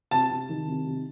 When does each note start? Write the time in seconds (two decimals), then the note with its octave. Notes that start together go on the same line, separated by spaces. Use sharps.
0.11 C3 A5
0.30 C3
0.49 D#3
0.67 C3
0.86 C3